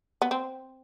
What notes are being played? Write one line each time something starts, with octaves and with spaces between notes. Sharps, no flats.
B3
C4